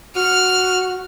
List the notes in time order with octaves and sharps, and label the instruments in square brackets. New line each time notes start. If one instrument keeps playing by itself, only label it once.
[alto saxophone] F#4 [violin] F6